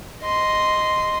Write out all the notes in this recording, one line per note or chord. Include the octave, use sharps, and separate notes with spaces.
D#5 C6